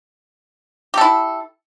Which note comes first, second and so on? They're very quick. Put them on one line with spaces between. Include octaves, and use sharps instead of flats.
G4 A4 E4